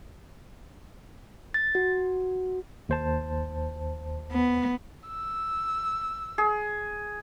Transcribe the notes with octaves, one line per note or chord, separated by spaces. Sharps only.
A6
F#4
D#2 C5 A5
B3
E6
G#4